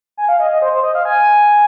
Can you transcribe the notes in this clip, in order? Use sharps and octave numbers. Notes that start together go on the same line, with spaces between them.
G#5
F5
D#5
D#5
C5
C5
D#5
F5
G#5